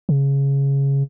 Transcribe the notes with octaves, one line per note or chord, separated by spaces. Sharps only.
C#3